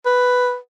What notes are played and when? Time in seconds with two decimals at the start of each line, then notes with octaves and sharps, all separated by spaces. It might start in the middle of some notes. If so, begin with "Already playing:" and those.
0.06 B4